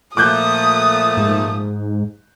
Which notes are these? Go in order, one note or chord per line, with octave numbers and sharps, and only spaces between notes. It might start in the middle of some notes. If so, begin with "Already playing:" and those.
A#2 F3 A3 D6 D#6 F#6 G6
G#2